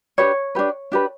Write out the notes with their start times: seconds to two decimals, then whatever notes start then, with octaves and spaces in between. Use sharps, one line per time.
0.18 D4 G4 B4 C#5
0.55 D4 G4 B4
0.92 D4 G4 B4